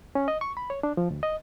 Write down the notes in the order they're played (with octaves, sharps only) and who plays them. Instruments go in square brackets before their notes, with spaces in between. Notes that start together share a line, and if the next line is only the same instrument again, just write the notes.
[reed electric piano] C#4
D#5
C#6
B5
C#5
D4
F3
D2
D#5